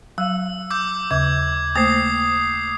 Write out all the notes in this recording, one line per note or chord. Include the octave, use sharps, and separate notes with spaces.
F#3 F5 E6
D6 E6 G6
D#2 C#3 G#6
A3 A#3 C5 D#6 C7